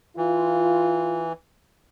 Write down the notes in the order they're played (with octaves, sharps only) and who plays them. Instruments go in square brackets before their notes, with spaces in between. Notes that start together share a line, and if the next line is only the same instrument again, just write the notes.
[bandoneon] E3 [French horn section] F4